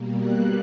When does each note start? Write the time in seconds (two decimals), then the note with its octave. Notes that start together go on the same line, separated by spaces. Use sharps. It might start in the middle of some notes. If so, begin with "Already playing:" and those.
Already playing: B2 G3 A#3
0.17 F#6